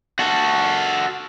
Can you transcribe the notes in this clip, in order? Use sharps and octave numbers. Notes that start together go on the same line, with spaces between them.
F#4 A4